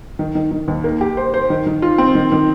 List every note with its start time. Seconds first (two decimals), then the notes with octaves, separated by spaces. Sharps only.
0.19 D#3
0.35 D#3
0.51 D#3
0.68 D#2
0.84 A#3
1.01 G4
1.17 C5
1.34 C5
1.50 D#3
1.66 D#3
1.82 F4
1.98 C4
2.15 D#3
2.32 D#3